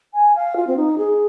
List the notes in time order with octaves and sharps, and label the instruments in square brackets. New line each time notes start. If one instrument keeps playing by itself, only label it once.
[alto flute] G#5
F5
F4
C4
D#4
G#4